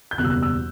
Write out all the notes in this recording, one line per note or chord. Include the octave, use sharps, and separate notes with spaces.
G6
F#1 E2 B2 G3 F#6
E6
F#6
E6